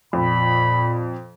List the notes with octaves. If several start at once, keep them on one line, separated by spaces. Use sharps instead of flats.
F2 A#2 B5